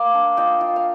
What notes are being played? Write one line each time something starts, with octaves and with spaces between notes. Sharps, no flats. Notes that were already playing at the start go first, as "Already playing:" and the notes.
Already playing: A#3 D5 F5
D4
F4 D#5 G5
F4
F5